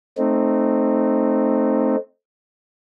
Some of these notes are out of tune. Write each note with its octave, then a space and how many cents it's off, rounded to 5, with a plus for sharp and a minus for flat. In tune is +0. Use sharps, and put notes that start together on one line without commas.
A3 +0 C4 +5 D#4 -15